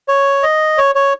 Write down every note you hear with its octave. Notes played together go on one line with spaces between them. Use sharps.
C#5
D#5
C#5
C#5